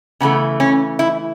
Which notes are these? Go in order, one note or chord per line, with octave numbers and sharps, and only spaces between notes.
C#3 E3 A3 B3
C#4
E4